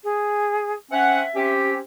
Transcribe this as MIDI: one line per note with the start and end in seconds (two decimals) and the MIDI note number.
0.04 0.74 68
0.91 1.21 60
0.91 1.21 61
0.91 1.53 76
0.91 1.21 78
1.35 1.77 60
1.35 1.77 61
1.35 1.77 67